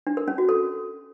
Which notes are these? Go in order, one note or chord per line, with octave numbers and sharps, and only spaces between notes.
D4
A#4
C#4
F#4
A4